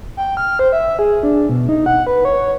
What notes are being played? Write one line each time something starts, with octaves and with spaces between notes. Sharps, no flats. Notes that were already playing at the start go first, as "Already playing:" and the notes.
G5
F6
C5
E5
G#4
D4
B2
D#4
F#5
B4
C#5